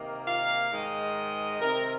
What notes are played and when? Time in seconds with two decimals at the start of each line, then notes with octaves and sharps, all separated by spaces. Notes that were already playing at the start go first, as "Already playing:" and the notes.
Already playing: C3 D#3 A#3
0.26 F5
0.70 G#2 D#3 G#3 D#4 D#5
1.59 C3 D#3 C4 A#4